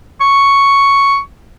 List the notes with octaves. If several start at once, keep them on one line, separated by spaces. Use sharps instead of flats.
C#6